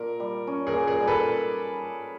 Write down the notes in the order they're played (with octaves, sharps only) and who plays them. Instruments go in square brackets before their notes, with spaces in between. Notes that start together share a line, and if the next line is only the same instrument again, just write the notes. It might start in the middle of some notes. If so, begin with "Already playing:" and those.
Already playing: [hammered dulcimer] A#2 [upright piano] A#4
[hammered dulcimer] G3
C#4
[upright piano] G#4 A#4
[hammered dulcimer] A#2
[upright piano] G#4 A#4
[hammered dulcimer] G3
[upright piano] A4 B4